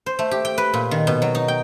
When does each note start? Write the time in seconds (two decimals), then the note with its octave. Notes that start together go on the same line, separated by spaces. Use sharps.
0.06 C5
0.19 A3
0.31 G4
0.45 G5
0.58 B4
0.74 A#2
0.91 D#3
1.07 B2
1.22 F#3
1.35 D#4
1.48 G5